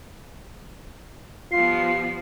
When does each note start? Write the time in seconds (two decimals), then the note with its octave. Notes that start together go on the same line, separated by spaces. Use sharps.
1.52 F3 G3 B3 F4 C7